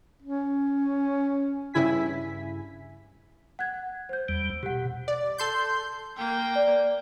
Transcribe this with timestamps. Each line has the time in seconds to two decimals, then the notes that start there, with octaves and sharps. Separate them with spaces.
0.22 C#4
1.74 G2 C#3 E4 G#5 B6
3.59 F#5 F#6 G#6
4.09 C5 G6
4.29 E2 G3
4.63 B2 G4 F#5
5.08 D5
5.38 A4 C6 G6
6.17 A#3 G5
6.56 D5